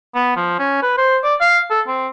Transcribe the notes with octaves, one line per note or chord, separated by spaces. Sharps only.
B3
F3
C#4
B4
C5
D5
F5
A4
C4